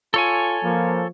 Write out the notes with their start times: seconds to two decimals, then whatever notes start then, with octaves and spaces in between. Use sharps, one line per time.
0.14 F4 A4 C#5 G#5
0.64 F3 A#3